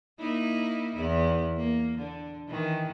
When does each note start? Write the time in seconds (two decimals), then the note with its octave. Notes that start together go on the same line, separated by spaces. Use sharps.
0.19 A#3 D#4 E4
0.95 E2 E4
1.57 A#3
1.98 D3
2.48 D#3 E3